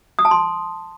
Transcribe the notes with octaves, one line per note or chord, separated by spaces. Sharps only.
D#6
A5
C6